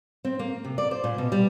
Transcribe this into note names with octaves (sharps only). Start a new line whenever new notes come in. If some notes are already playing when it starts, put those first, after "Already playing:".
C4
A#3
C3
D5
C5
A#2
B2
G3